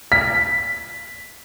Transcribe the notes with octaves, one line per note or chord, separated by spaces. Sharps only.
B6